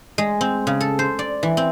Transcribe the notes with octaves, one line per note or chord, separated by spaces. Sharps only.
G#3
C4
C#3
A4
C5
D5
E3
C4